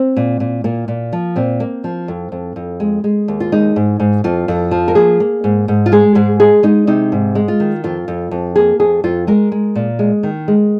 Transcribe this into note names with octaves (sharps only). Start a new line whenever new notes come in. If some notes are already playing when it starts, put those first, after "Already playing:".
Already playing: C4
A#2
A#2
A#2 A#3
A#2
F3
A#2 C4
A#3
F3
F2
F2
F2
G#3
G#3
D#2
F4
G#3 D#4
G#2
G#2
F2 F4
F2
F3
A#4
A#3 G#4
A#3
G#2
G#2
F4
G#3 G#4
G#2 G#4
G#3 G#4
G#3 D#4
C3 D#4
G#2
G#3
F4
D#3
F2 F4
F2
F2
A#3 G#4
F2 G#4
F2 F4
G#3 A#4
G#3
A#2
G#3
D#3
G#3